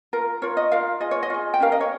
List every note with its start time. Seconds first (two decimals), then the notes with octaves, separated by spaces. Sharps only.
0.13 F4 A#4
0.42 F4 A#4 C#5
0.57 D#5
0.71 F4 A#4 F5
1.00 F4 G#4 D#5
1.11 C#5
1.23 D#5
1.30 F4 G#4
1.54 G5
1.60 C#4 G4 A#4 F5
1.72 D#5
1.81 C#5